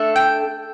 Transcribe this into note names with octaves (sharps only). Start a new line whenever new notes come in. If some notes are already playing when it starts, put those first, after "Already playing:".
Already playing: A3 D4 A4
G5